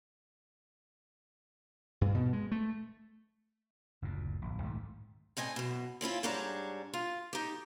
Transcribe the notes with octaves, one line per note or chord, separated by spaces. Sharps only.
G2
B2
G#3
A3
F#1 D2 A#2
D1 A#1
B1 G#2 D#3 A3
A2 C4 D#5 G#5
F#2 B2
C4 C#4 E4 F4
G#2 G3 D4 G#4 C#5 A#5
F4
D#4 G4